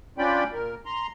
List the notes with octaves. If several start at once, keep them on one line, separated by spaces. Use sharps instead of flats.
C#4 D4 F4 D5 G5 B5
A#2 A#4
A#5 C6